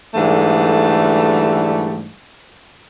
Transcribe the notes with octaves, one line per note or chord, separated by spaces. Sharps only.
G#2 D3 E3 G3 A3